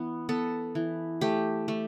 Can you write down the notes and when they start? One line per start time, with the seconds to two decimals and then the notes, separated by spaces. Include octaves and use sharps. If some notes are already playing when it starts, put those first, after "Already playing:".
Already playing: E3 B3
0.29 B3 A4
0.75 E3
1.21 A3 G4
1.68 A3